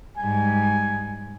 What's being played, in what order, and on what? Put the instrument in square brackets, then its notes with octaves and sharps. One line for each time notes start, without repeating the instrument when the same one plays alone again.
[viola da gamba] G#2 G3 [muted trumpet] G#5